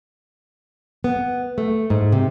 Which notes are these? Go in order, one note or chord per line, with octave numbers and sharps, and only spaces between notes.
B3
A3
G#2
C3